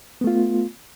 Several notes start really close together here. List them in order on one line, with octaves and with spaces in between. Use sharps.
B3 A3 F4